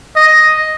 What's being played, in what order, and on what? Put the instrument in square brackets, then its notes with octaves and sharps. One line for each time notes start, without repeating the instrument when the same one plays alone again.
[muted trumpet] D#5